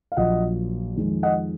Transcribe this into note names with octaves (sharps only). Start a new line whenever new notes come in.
F5
A#1 A#2 F#3 D#5 F#5
F2 D#3 G#3
D#5 F#5